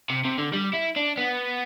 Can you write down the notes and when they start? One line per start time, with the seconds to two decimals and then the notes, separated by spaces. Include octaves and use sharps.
0.10 C3
0.25 C3
0.38 D3
0.54 G3
0.74 E4
0.97 D4
1.18 B3